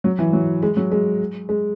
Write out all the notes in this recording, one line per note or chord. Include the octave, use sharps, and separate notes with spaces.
F#3
E3
F#3
G#3
F#3
G#3
G#3